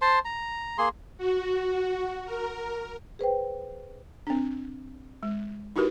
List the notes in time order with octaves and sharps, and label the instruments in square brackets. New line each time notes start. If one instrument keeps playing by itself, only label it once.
[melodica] C5 A5 C6
A#5
A#3 G#4 C6
[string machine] F#4
A#4
[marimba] G#4 B4 C5 G5
[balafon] C4 D4
G#3
D#4 E4 F#4 G4 A#4 B4